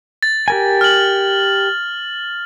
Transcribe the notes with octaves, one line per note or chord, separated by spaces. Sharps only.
A6
G4 A#4 G#5
F6 F#7